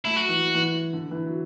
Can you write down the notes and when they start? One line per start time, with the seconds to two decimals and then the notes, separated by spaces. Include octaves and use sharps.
0.05 A3 E4
0.16 F#3 F#4
0.29 E3
0.35 F#3
0.55 E3
0.93 D3
1.11 E3
1.26 F#3